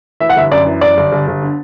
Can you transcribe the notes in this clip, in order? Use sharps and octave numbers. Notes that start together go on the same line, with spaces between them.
E3 E5
F#5
G1 E5
F#2 D5
E3
F#2 D5
G1
G1
G1
D3